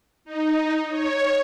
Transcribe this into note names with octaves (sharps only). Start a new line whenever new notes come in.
D#4
C#5